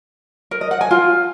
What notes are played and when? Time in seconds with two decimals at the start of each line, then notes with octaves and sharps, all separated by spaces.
0.51 A#4
0.61 D#5
0.71 F#5
0.81 G#5
0.91 F4